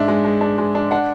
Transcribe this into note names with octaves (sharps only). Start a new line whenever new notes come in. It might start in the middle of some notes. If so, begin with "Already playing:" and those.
Already playing: G#2 D4 E5
G#3
G#3
D4
G#3
D4
D4 F#5